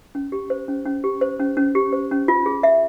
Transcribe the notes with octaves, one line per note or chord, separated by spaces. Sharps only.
C#4
G4
C5
C#4
C#4
G4
C5
C#4
C#4
G4
C5
C#4
F4
G#4
E5